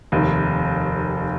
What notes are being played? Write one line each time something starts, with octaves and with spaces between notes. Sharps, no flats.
F1 D#2 D#3